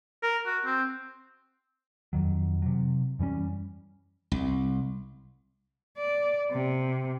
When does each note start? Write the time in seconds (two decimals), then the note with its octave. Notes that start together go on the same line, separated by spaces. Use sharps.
0.23 A#4
0.46 F#4
0.65 C4
2.13 F2 D#3 F#3
2.62 C3 F#3
3.19 F#2 E3 G3 C#4
4.32 C2
5.98 D5
6.51 C3